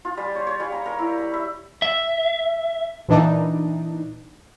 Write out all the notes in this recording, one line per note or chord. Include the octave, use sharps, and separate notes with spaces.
F4
G3
C#5
C#5
G3
A#5
A#4
E4
B5
E5
E5
A#2 E3 D4 D#4